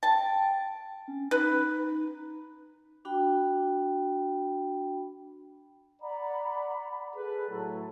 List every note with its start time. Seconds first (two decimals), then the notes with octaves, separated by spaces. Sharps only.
0.03 G5 A5
1.08 C#4
1.31 D#4 B4
3.05 D4 F#4 G5 B5
6.01 D5 F#5 A#5 B5
7.15 G#4 A4 B4
7.49 A2 F#3